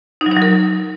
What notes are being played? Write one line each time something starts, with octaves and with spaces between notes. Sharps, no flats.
D#4
F#3
D#4
F#3
A#4